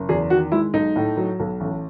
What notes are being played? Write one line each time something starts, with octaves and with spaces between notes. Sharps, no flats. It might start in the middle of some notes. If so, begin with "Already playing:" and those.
Already playing: F#1
E2 G#4
D#3 F#4
G#3 E4
B1 D#4
A2
F#3
B1
A1